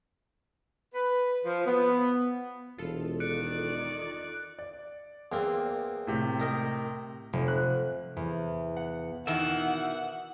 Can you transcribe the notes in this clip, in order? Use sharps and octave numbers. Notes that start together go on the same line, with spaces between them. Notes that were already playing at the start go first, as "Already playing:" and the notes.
B4
F3
B3
E1 F4 A4
D#3 D5 F#6 C#7 D7
D5
E2 A#3 C4
A2 C3
D#4 A#4 D#5
F1
F#6
E2
F#5
B2 D#3 E3 E5 F#5